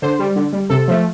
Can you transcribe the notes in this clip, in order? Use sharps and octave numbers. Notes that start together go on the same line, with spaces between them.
D3 C5
G3
D3
G3
C3 A4
F3 A3